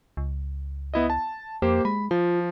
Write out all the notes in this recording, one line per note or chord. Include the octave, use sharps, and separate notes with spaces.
C#2
B3 E4 D#5
A5
F2 A#3 G4 C5
G#3 B5
F3 F4